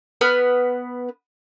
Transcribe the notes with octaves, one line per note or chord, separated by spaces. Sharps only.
B3 B4 F6